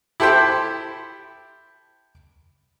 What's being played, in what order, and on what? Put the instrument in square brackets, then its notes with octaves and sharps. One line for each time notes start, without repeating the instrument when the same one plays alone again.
[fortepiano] E4 G4 A4 C5 G5